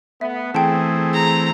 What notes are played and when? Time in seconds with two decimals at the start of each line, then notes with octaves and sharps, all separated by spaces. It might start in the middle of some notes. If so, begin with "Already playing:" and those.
0.21 A3 B3 E5
0.55 E3 A3 C4 G#4 G5 A5
1.14 A#5